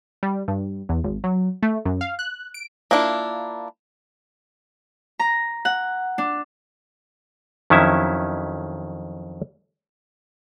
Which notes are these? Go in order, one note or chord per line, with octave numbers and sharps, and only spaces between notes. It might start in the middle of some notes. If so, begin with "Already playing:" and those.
G3
G2
E2
G#1
F#3
A3
F#2
F5
F#6
D7
A#3 B3 D4 E4 F4
A#5
F#5
D4
F2 D#3 F#3 C#4 E4 E5